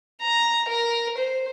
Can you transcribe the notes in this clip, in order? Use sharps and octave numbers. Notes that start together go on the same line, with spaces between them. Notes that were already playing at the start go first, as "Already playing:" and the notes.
A#5
A#4
C5